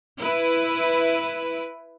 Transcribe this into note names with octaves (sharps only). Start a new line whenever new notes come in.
E4 B4